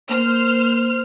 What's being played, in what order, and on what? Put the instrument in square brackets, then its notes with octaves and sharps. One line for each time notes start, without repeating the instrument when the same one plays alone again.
[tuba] A#3 [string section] C5 F6